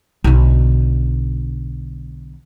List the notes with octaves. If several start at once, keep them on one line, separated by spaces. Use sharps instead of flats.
B1 D3